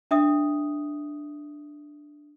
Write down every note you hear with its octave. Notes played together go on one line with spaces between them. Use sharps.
D4 E5 D#6